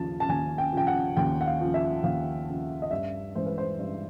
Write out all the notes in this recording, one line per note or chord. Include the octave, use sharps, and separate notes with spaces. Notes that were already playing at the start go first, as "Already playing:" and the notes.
Already playing: D#2 C#3 F3 A5
A5
D#2 G#5
G5
C#3 F3 G5
F#5
D#2 G5
F#5
F5
C#3 F3
E5
D#2 F5
C#3 F3
D#5
G2 E5
E3 G#3 C5
B4
C5
G2